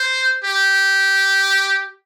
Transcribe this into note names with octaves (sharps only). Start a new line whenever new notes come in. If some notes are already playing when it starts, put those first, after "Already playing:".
Already playing: C5
G4